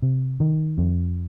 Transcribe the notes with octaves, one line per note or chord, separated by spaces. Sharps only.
C3
D#3
F2